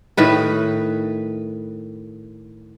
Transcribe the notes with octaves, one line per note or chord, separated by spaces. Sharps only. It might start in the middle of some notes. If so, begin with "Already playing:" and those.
A2 D#3 B4